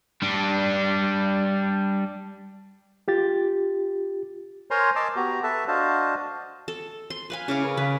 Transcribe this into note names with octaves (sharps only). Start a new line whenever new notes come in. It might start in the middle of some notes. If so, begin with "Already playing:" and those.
G3 D4
F4 G4 A6
A#4 C5 C#5 G#5 A#5 C6
D#5 A5 C6 D6 E6
B3 F#4 G4 A#5
A4 B4 E5 A5
D4 F#4 C5 D#5 F5 A5
A4
C6
B4 F5 G#5
C#3 C#4 E4 F5 D6
A#4 B4
C#3 B4 F5